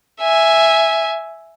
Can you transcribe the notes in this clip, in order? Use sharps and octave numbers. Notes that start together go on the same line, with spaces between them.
E5 G#5